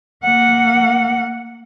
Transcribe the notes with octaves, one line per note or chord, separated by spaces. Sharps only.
A#3 F#5